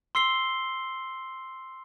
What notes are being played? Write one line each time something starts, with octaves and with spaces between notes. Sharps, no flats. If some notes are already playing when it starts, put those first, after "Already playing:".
C6 E6 C7 G7